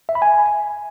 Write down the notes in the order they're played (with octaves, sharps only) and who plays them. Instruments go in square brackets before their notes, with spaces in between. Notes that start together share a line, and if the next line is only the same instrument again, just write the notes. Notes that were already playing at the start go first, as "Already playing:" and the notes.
[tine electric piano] E5
B5
G#5